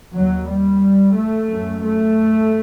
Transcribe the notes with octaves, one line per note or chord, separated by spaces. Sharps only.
D#2 F#3
G3
A3
F#2
A3